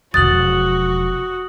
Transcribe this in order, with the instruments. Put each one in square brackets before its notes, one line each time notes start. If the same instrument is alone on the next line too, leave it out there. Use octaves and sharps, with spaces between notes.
[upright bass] E1 F3 [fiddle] F#4 [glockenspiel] D#6 F#6 F#7 [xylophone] A6